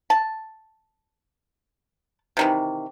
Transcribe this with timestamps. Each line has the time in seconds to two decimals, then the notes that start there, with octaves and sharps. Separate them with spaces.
0.10 A5
2.37 C3 D#3 E3